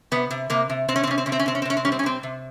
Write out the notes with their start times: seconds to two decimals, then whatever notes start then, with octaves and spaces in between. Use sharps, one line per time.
0.11 C3 B3
0.31 C3
0.50 C3 A#3
0.70 C3
0.88 C3 C4
0.96 C#4
1.03 C4
1.07 C3 C#4
1.18 C4
1.26 C3 C#4
1.32 C4
1.39 C#4
1.46 C3 C4
1.55 C#4
1.62 C4
1.65 C3 C#4
1.77 C4
1.85 G3 C#4
1.92 C4
1.99 C#4
2.03 C3 C4
2.23 C3